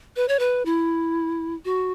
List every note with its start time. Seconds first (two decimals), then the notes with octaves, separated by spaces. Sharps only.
0.16 B4
0.28 C#5
0.39 B4
0.66 E4
1.65 F#4